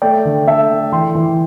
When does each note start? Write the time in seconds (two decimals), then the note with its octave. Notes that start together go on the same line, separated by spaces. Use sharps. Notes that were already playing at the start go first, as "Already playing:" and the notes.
0.02 A3 D5 G5
0.25 D3
0.47 A3 E5 A5
0.71 A3
0.92 E3 G5 C6
1.15 E3